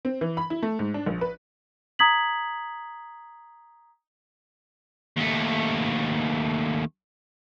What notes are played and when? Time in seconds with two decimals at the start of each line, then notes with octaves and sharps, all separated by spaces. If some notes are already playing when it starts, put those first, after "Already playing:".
0.05 C4
0.21 E3
0.37 B5
0.50 E4
0.63 A3
0.79 G#2
0.94 D4
1.06 A#1
1.21 B4
1.99 A#5 D#6 G#6 B6 F#7
5.17 D#2 A3